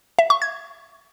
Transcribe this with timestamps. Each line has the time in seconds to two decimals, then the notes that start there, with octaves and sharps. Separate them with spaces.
0.19 E5
0.30 C#6
0.42 G#6